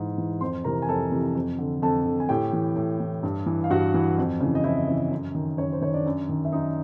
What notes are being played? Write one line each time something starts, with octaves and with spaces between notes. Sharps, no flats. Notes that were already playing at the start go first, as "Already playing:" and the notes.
Already playing: G#2 E3
E3
F2 C5 C6
C3 E3 A#4 A#5
G#5
F2 A4 A5
C3 E3
F2
D3
F2 A4 A5
D3
G#5
A2 G4 G5
E3
A2
E3
G2
E3
F5
G2 F#4 F#5
E3
F2
C#3 E3
D#5
F2 E4 E5
C#3 E3
F#2
D#3
F#2 C#5
C5
D#3 C#5
D4 D5
F#2
D#3
E5
F#2 D#4 D#5